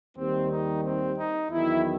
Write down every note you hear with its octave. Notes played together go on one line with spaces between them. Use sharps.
D#2 D#3 G3 C4
D#4
C4
D#4
E2 D#3 F#3 E4